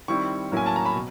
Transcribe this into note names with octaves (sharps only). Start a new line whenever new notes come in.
D#3 G3 C4 E4 C#6
A2 F#3 A#3 C#4 E4 G#5
A5
A#5
B5
B2